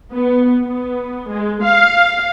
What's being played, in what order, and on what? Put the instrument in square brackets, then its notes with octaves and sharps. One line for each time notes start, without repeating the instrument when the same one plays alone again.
[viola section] B3
B3
G#3
F5